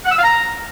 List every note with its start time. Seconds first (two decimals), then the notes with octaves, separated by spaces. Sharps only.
0.05 F#5
0.11 E6
0.18 F5
0.24 A#5